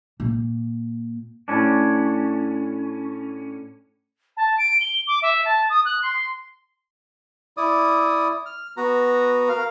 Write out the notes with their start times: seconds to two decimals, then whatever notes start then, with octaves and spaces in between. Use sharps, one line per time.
0.20 A#2
1.48 A2 C#4 D4
4.37 A5
4.58 D7
4.80 G7
5.07 D6
5.22 E5
5.45 A5
5.69 D#6
5.85 F#6
6.02 C6
7.57 E4 D5 D#6
8.46 F6
8.77 B3 F#4 A#5
9.49 A#4 F5